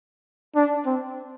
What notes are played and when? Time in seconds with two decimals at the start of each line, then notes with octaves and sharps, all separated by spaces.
0.55 D4
0.86 C4